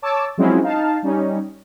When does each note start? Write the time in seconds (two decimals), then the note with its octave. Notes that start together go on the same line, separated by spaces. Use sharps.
0.02 C#5 A5 D6 E6
0.37 F3 F#3 G#3 C4 C#4 E4
0.62 D#4 F5 A5
1.03 G3 C#4 D#4